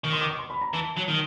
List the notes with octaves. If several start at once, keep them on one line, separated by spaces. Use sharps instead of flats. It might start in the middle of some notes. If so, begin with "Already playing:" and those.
D#3 C#6
C6
D6
C#6
C6
B5
A#5
E3 A5
F#3
D#3